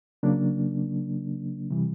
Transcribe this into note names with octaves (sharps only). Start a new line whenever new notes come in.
C#3 F#3 A#3 D4
C3 E3 G3